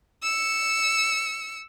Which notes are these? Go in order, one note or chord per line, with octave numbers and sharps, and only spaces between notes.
E6 C#7